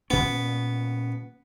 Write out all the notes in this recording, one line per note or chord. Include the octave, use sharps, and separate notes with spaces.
A#2 B3 C#4